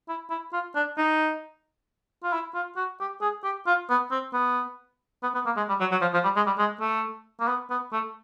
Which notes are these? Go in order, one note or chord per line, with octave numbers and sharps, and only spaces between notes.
E4
E4
F4
D4
D#4
F4
E4
F4
F#4
G4
G#4
G4
F4
B3
C4
B3
B3
B3
A#3
G#3
G3
F#3
F#3
F3
F3
G3
G#3
G3
G#3
A3
A#3
B3
B3
A3